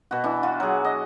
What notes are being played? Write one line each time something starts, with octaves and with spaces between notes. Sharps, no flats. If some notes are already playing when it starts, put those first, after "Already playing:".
B2 F#4
E3 D4
F4 F#4
F#3 G#4
D#5